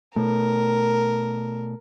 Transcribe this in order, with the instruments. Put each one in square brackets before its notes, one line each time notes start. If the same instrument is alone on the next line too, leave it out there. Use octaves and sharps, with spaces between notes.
[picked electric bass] B2 A3 [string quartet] A#4